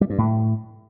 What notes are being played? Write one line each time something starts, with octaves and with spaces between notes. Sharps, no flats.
G3
G2
A2